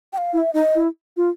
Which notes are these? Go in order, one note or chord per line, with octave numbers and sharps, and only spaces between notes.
G5
F5
E4 F5
E5
D#4 D#5
E4
F4